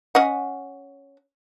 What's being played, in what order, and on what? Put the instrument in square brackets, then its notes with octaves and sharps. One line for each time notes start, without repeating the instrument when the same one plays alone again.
[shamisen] C#4 D#5 F#5